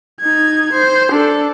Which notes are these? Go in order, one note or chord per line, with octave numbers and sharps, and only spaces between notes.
D#4 G#6
C5
D4 A4